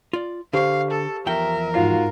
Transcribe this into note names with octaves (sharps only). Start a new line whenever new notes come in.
F4 D5
D3 G4 C5 F5 C#6
A4
E2 F3 A#4 E5 G5
G#2 F4 F#4 F5 C7